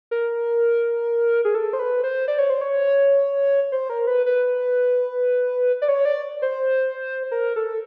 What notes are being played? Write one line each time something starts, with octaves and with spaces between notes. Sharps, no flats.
A#4
G#4
A4
C5
B4
C5
D5
C#5
C5
C#5
C5
A#4
B4
B4
D5
C#5
D5
C5
A#4
A4